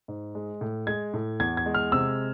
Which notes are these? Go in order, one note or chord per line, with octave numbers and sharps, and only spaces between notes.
G#2
G#3
A2
G#3 G#6
A2
E2 G#6
G#6
G#3
F6
C3 E6